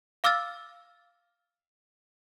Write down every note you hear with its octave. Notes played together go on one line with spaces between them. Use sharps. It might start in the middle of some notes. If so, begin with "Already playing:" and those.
F5 D6 E6 F6 A6